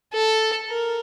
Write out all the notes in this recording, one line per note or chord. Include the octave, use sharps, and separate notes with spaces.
A4
A#4